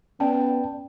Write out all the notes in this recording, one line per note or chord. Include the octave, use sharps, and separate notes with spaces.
B3 C#4 D5 G5 A5